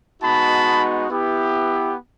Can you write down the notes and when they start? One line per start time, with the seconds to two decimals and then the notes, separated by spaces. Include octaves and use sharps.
0.23 G#3 B3 D#4 F#4 A5 B5
1.10 B3 E4 G4